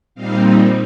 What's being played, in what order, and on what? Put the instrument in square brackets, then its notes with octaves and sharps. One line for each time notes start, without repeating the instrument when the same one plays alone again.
[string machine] A#2 G3 C4 D#4 F5